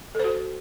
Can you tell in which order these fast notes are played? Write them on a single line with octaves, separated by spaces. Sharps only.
A4 C5 F#4